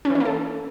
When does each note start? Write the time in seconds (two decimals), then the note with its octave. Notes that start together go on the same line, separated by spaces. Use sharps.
0.05 C#4
0.10 E3
0.15 C#4
0.20 A#3
0.25 A4